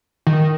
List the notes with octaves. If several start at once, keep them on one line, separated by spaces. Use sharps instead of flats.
D#3